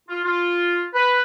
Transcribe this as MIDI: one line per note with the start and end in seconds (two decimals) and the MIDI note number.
0.09 0.20 65
0.25 0.85 65
0.94 1.21 71